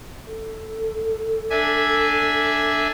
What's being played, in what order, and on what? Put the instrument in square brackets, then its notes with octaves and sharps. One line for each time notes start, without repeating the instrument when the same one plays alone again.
[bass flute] A4
[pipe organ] D4 E5 G#5